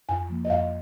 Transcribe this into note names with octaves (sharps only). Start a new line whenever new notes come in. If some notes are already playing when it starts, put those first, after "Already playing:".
F2 G#5
F3 A#3
D#5
F2 F5